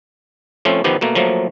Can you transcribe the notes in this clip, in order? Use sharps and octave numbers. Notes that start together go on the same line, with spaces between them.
F3 A3 C4 C#4
D#3 F3 B3 G4
B2 A3 A#3
F3 F#3 A3 A#3